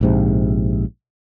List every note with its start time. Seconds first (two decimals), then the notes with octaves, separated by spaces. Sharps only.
0.01 A#1 G#2 C3